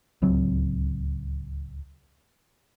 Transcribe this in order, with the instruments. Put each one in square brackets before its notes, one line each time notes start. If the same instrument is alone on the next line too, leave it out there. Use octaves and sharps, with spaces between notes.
[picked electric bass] D1 C#2 F#3 C4